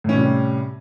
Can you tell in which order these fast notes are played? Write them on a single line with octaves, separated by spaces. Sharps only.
A2 C#4 C3 G3